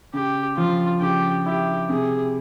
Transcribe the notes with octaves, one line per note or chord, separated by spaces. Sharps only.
C#3 G4
F3 F4
C#3 G4
E4 G4
C3 G#4